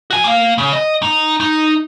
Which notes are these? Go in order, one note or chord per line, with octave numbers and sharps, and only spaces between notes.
F#4 G#5
A#3 F5
C#3
D#5
D#4
D#4